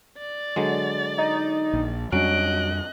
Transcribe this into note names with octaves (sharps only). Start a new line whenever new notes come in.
D5 A6
D3 F#3 G#3
D#4
A#1
F2 F#3 G3 C#4 D4 D#5 F#6 D7